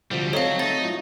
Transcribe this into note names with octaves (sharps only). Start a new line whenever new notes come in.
D2 C3 F3 G3 F4
F#3 C4 D#4 A4 C#5 F5
F#3 A3 D#4 A6
F4